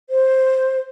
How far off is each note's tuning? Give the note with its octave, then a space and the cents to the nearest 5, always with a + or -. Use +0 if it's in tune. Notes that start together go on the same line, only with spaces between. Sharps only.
C5 +5